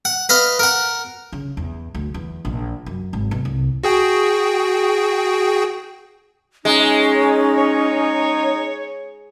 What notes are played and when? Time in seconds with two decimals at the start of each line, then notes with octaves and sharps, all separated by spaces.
0.05 F#5
0.29 B4 D#5 F5
0.59 A#4 F#5
1.32 C#3
1.57 E2
1.94 D2
2.14 E2
2.45 A#1
2.86 F#2
3.13 G#1
3.31 B1
3.45 C2
3.83 F#4 G#4 G5
6.65 G#3 C#4 D#4
7.57 C#5